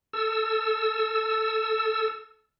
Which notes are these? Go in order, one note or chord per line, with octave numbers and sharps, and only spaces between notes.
A4 E6